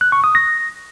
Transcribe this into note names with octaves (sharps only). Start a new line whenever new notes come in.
F#6
C#6
D#6
A#6